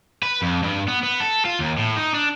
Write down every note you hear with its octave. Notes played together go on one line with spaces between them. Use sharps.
B4
F2
G2
B3
B3
A4
F4
D#2
A2
D#4
D4